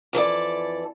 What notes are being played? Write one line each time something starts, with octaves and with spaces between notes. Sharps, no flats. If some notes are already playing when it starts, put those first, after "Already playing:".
F2 E3 A4 D5